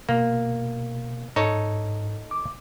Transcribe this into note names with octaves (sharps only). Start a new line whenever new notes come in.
B2 A#3
G#2 D#4 A4 C#5
D6